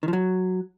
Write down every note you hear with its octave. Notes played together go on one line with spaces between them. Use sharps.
D#3
F3
F#3